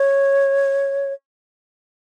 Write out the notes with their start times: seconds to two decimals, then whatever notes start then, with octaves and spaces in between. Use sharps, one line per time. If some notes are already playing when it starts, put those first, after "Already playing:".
Already playing: C#5